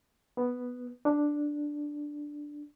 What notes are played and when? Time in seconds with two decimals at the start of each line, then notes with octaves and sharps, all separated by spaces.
0.37 B3
1.05 D4